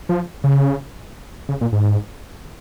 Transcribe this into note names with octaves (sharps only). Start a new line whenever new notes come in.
F3
C#3
C#3
A#2
G#2